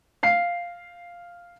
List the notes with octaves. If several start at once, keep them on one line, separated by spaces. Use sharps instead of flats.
F5 C7